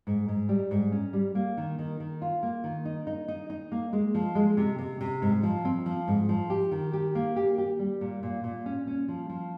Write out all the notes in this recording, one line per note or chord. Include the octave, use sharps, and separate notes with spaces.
G#2
G#2
G3
G#2
C#4
G3
A#3
D#3
D#3
D#3
F4
A#3
D#3
D#4
D#4
D#4
D#4
A#3
G#3
F3
G#3
C3
C3
C3
G#2
F3
C4
F3
G#2
F3
G4
D#3
G4
A#3
G4
G4
G3
A#2
A#2
A#2
C#4
C#4
F3
F3